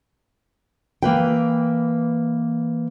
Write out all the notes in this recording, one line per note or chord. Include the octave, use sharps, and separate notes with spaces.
E3 A#3 B4 G5